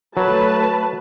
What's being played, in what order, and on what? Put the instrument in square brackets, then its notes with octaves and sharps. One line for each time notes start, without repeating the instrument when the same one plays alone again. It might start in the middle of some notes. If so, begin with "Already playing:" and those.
[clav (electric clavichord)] F#3 [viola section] A3 B4 A5